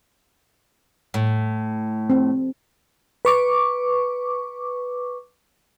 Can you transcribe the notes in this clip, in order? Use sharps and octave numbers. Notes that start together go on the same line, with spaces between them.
A2
C4
B4 C#6 D6